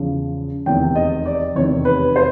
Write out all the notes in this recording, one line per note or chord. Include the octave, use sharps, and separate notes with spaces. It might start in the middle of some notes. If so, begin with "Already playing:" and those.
Already playing: E2 C#3 F3
F1 E2 C3 D#3 G5
D#5
D5
F1 E2 C3 D#3 C#5
B4
C5